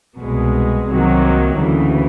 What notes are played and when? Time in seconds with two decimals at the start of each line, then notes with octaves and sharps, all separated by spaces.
0.20 C2 B2 G#3
0.89 C2 C3 D#3 F#3 A#3
1.57 D2 C#3 E3